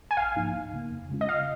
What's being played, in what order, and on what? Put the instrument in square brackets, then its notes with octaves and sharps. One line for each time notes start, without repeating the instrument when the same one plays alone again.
[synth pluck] G#5
[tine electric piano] A#1 [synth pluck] F5
[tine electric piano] G#2 F3 A#3 D#4
C#2
C#3 A#3
F2
C#3 G#3 C#4 F4
[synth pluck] D#5
[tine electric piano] C#3 [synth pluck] F5